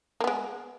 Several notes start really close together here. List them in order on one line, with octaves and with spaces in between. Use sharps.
A#3 B3 G#3